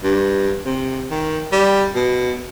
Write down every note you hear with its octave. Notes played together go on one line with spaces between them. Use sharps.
G2
C3
D#3
G3
B2